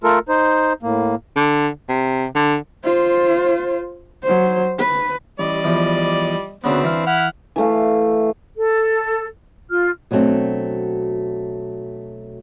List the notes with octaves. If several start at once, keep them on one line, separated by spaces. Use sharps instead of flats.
A3 F4 A4 A#4
D#4 C5
A2 A#3
D3
C3
D3
F4 C5
F#3 C5
B4
A1 G3 D5 D#5
E2 E3 F3
D2 C#3 B3 C4 D4 B4
E3 F5
E4 F#5 F6
E3 A3 F5
A4
F4 F6
B2 F#3 G3 A3 C4 D4